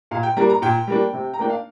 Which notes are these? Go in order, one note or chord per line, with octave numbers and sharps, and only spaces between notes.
A#2 F5
G5
G3 A#3 D4 A#5
A#5
A#2 G5
G3 A#3 D4
C3
A#5
A#3 D4 G5
F5